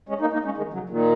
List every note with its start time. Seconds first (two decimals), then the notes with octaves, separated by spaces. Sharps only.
0.09 G#3 C#4
0.21 A#3 D#4
0.33 A#3 D#4
0.45 G#3 C#4
0.57 D#3 G#3
0.73 C#3 F#3
0.89 A#2 D#3